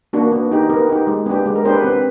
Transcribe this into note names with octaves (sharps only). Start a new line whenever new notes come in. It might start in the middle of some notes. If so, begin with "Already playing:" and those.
A#3 D4 F#4
B3
D#4 G4
B3 A#4
D#4 G4
G#3
B3 D4 G4
G#3
A#4
B3 D4 G4 C5
B4
C4 B4